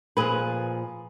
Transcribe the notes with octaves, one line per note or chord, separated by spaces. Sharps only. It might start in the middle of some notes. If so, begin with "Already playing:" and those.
A#2 F3 G#4 B4